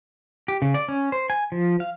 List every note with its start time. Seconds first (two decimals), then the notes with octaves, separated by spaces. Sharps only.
0.48 G4
0.62 C#3
0.74 D5
0.88 C#4
1.12 C5
1.30 G#5
1.52 F3
1.80 F5